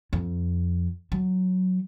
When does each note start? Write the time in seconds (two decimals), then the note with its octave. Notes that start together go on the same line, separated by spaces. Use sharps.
0.13 F2
1.12 F#3